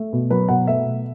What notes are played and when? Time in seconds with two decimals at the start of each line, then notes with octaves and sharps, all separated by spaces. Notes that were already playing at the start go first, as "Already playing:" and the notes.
Already playing: A3
0.13 B2
0.30 F#3 B4
0.49 B2 F#5
0.67 A3 E5
0.85 B2